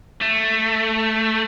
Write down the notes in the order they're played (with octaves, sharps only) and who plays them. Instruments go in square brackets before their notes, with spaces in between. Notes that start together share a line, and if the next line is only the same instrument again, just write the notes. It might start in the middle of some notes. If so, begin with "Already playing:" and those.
[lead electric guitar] A3